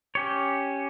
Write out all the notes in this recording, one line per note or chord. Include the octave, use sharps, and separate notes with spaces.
C#4 G4 C#5